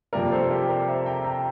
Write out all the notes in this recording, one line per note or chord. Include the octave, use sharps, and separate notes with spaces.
F2 C3 G3 A#3 A#4 D5
A4 C5
G4 A#4
A#4 D5
C5 E5
G5 A#5
G5 A#5